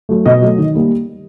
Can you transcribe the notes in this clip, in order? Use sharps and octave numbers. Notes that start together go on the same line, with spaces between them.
F#3 A3
B2 D#5
F#3 A3
D#3
G3 A#3